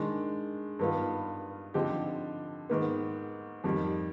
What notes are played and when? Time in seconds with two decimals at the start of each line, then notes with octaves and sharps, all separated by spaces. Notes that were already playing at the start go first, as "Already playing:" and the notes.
Already playing: D#3 G#3 D4
0.79 G2 D#3 B3 F4
1.74 D3 F3 C4 D#4 G4
2.69 G#2 D#3 B3
3.64 F2 D#3 G3